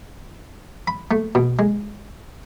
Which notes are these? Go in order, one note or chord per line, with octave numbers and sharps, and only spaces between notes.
B5
A3
B2
G#3